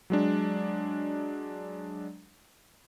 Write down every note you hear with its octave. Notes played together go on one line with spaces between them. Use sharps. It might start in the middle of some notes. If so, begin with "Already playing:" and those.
F#3 G#3 D4